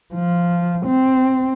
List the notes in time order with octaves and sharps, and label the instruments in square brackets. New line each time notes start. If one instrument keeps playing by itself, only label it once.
[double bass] F3
C4